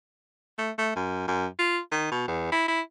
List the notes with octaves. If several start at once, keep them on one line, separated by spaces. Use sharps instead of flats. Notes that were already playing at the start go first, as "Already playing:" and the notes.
A3
A3
F#2
F#2
F4
D#3
B2
E2
E4
E4